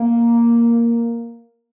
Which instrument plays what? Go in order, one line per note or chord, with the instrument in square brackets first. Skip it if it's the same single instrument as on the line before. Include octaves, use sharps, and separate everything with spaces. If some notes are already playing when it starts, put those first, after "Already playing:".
Already playing: [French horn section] A#3